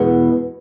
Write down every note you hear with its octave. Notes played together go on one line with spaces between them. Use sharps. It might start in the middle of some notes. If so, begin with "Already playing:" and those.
Already playing: E2 B2 G#3 B3